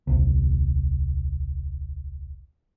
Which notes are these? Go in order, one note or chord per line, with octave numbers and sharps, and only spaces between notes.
D#1 C2